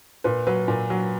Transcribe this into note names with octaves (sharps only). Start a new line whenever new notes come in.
A#2 B4
F#3 B4
A#2
F#3